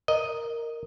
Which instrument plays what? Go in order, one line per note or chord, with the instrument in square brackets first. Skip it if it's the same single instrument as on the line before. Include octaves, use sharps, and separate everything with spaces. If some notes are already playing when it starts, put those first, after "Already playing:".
[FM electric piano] A#4 [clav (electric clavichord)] D#5